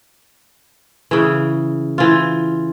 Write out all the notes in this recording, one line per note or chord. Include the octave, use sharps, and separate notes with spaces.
C#3 E3
E3 F4